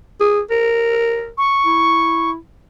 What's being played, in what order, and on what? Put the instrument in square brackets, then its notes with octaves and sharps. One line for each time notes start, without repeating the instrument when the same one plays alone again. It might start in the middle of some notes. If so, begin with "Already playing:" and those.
[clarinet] G#4
A#4
[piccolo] C#6
[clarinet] E4